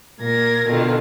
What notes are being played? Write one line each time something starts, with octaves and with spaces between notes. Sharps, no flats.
A#2 A#4 G#6 A#6
B2 D3 D#3 F4